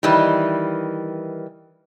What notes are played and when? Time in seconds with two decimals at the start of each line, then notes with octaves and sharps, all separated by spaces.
0.03 D#3 E3 G3